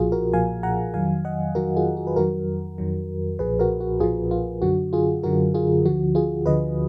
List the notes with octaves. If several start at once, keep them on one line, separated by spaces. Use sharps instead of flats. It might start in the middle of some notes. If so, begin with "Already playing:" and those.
Already playing: B1 A#2 F3 F4 F#4 G#4
F#4 A#4
B1 A#2 F3 F5 G#5
F#5 A#5
F2 D#3 F#3 F5 G#5
D#5 F#5
F2 D#3 F#3 F#4 A#4
F4 G#4
F#4
B4
F2 D#3 F#3 F#4 A#4
F2 D#3 F#3
B1 A#2 F3 G#4 B4
F#4 A#4
F#4
B1 A#2 F3 F4 G#4
F4
F#2 D3 F#3 F#4
F4 G#4
F#2 D3 F#3 F#4 A#4
F4 G#4
D2 D3 F3 F#4
F4 G#4
D2 D3 F3 B4 D#5